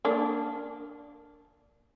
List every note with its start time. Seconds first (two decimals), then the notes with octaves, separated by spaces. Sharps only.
0.05 A#3 D4